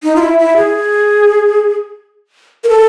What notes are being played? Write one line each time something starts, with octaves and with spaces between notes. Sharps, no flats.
D#4
F4
E4
E4
G#4
A#4
A4